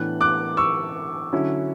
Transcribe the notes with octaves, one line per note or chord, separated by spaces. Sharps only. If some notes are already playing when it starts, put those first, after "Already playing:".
Already playing: A2 E3 B3 D4 F#6
D6 F#6
C#6 E6
D3 F#3 C#4 E4